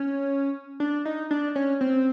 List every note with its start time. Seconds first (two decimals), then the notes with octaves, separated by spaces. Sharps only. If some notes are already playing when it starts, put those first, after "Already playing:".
Already playing: C#4
0.80 D4
1.05 D#4
1.31 D4
1.56 C#4
1.81 C4